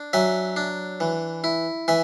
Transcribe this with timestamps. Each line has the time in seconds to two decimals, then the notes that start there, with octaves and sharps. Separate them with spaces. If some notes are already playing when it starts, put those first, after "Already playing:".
Already playing: D4
0.13 F#3 E5 G#5
0.56 D4
1.00 E3
1.44 E4
1.88 E3 E5 G#5